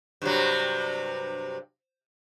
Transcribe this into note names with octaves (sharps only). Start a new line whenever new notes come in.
G2 C3 F#3